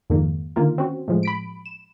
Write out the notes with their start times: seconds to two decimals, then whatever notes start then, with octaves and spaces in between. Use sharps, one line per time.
0.10 F2 G#2 D#3 A#3
0.56 D3 D#3 A#3 F4 A#4
0.78 C4 C#4 F#4
1.08 A2 F3 G#3
1.23 B5 B6 D7
1.66 E7